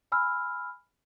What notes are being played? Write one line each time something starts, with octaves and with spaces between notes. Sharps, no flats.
G#5 B5 E6 F6